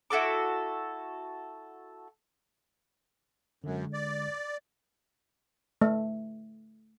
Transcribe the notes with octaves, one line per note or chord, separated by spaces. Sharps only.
E4 F#4 A4 D6
F#2 D3 G#3
D5
A3